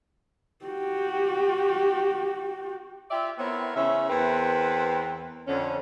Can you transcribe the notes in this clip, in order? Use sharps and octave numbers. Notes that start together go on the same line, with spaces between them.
F#4 G4
F4 G4 D5 E5
B3 C4 E4 A#4 C#5 E5
C#3 E3 C#4 C5 E5
E2 C4 A#4 B4
F2 D3 C#4